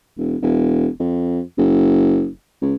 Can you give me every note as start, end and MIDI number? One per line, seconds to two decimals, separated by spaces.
0.17 0.36 28
0.42 0.88 28
1.00 1.41 41
1.58 2.28 30
2.61 2.75 37